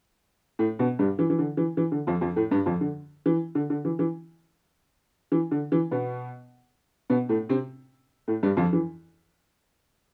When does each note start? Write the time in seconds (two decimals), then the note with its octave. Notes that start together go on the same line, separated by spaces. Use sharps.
0.59 A2 A3
0.79 B2 B3
0.99 G2 G3
1.19 E3
1.30 E3
1.39 D3
1.57 E3
1.77 E3
1.92 D3
2.07 F2 F3
2.21 F2 F3
2.36 A2 A3
2.51 G2 G3
2.66 F2 F3
2.81 D3
3.26 E3
3.55 D3
3.70 D3
3.85 E3
3.99 E3
5.32 E3
5.51 D3
5.72 E3
5.91 B2 B3
7.10 B2 B3
7.29 A2 A3
7.49 C3 C4
8.28 A2 A3
8.43 G2 G3
8.57 F2 F3
8.73 E3